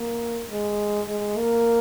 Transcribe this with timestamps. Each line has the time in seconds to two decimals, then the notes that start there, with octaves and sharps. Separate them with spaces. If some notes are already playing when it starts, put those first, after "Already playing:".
Already playing: A#3
0.51 G#3
1.08 G#3
1.37 A#3